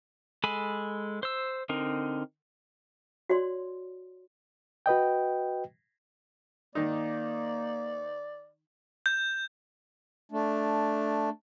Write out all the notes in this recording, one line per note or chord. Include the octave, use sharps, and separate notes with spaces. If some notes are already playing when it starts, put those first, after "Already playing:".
G#3 A4 G#5 B5
C5 E6
D3 C4 D#4 A#4
F#4 C#5 D5 C6
F#4 B4 D#5 G5
D#3 A#3 D#4 D5
G6
A3 D4